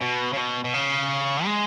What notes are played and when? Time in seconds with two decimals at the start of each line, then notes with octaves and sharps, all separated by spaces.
0.02 B2
0.33 C#3
0.37 B2
0.64 B2
0.74 C#3
1.45 G#3